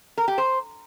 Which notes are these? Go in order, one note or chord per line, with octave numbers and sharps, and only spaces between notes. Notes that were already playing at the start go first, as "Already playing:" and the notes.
A#4
G4
C5